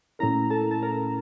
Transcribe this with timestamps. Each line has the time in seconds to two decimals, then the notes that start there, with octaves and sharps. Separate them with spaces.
0.19 A#2 A3 C#4 E4 A#4 A#5
0.50 A4 A5
0.71 A5
0.82 A#4 A#5